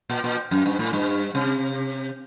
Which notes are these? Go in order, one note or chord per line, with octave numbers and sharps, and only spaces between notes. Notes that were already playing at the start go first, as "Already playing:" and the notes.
A#2
A#2
F#2
G2
A2
G2
C3